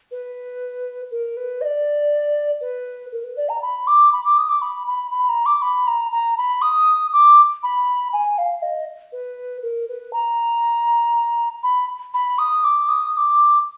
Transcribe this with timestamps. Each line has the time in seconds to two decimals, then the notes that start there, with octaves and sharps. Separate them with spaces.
0.12 B4
1.11 A#4
1.37 B4
1.61 D#5
1.65 D5
2.61 B4
3.12 A#4
3.24 B4
3.37 D5
3.49 A#5
3.62 B5
3.87 D6
4.13 B5
4.25 D6
4.38 D#6
4.49 D6
4.62 B5
4.87 B5
5.12 B5
5.29 A#5
5.46 D6
5.62 B5
5.87 A#5
6.12 A#5
6.37 B5
6.62 D#6
7.13 D6
7.63 B5
8.13 G#5
8.38 F5
8.62 D#5
9.12 B4
9.63 A#4
9.89 B4
10.13 A#5
11.63 B5
12.14 B5
12.39 D#6
12.64 D6
12.89 D#6
13.13 D#6
13.17 D6